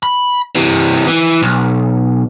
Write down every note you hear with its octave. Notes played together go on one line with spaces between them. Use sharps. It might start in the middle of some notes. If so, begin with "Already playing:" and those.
B5
C3 E3
E3
B1